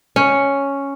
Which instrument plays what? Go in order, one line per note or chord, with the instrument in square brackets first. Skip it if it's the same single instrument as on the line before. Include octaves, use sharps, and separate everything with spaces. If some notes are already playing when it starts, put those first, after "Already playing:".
[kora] C#4